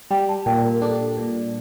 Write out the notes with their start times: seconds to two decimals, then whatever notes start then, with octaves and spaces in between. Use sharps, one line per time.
0.11 G3 G5
0.29 A5
0.46 A#2 G5
0.65 A#4
0.82 D4 A4
1.18 A#2